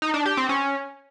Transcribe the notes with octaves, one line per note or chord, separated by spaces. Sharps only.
D#4
D4
G4
C4
C#4